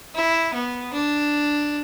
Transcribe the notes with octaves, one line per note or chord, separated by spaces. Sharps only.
E4
B3
D4